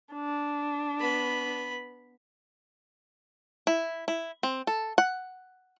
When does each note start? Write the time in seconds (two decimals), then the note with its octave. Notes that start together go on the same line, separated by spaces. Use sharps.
0.13 D4
0.99 B3 B5
3.67 E4
4.08 E4
4.43 C4
4.67 A4
4.98 F#5